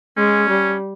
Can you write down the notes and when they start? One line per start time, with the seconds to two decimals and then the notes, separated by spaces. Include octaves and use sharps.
0.17 G#3 C#4
0.49 G3